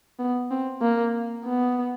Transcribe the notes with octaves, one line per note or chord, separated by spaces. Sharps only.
B3
C4
A#3
B3